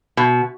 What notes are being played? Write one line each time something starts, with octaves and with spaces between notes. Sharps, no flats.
B2